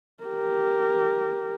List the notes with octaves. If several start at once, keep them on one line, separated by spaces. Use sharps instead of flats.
G4 A#4